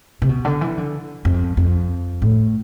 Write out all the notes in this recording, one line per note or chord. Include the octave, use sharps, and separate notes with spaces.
C3
B2
D3
E3
D3
F2
F2
A2